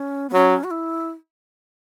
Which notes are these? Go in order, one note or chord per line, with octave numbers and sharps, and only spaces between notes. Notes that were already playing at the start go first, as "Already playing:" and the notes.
Already playing: C#4
B3
F#3 C#4
F#4
E4